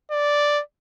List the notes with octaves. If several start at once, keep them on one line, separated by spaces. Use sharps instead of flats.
D5